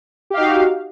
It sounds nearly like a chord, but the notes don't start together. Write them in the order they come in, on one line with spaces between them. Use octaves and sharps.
G4 F5 D#4 F#4